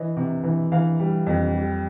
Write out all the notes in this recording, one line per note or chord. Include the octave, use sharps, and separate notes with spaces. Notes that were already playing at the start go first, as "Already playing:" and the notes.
Already playing: E3 D#5
C3
E3
E3 F5
G3
F2
G3